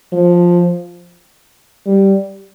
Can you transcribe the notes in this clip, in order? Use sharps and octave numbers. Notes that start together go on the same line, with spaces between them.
F3
G3